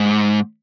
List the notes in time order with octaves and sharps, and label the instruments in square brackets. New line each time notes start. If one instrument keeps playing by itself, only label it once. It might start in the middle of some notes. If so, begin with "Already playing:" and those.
Already playing: [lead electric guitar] G#2